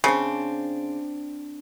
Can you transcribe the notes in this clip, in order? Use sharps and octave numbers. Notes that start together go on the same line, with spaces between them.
C#3 C4 D4